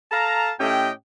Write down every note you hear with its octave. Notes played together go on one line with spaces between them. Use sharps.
A4 F5 A5 A#5
A2 A3 C#4 G4 D#5 G5